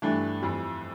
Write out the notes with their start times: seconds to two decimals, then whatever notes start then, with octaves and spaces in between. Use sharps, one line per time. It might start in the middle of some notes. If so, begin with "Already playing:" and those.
0.02 G2 E3 A3 D4
0.42 F2 E3 G3